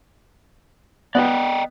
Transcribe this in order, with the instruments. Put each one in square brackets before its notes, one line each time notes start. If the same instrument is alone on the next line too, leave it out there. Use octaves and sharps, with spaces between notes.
[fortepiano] B3 [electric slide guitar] D5 D#5 G5